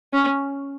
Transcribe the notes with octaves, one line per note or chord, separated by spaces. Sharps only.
C#4